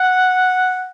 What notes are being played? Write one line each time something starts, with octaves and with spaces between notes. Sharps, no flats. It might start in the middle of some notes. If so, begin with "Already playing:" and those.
Already playing: F#5